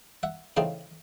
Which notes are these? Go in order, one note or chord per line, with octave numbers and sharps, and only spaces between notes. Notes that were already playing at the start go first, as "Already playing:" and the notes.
E5 F#5
C#3 E3 A3 C4 D#4 F5 G5